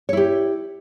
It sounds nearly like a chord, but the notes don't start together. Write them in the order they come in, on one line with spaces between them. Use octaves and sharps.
C#5 E4 G4